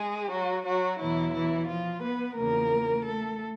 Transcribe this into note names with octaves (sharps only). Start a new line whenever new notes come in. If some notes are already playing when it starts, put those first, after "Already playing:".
Already playing: G#3 G#4
F#3 F#4
F#3 F#4
E2 B2 E3 F#3 E4
E3 E4
F3 F4
B3 B4
E2 C#3 F3 A#3 A#4
A3 A4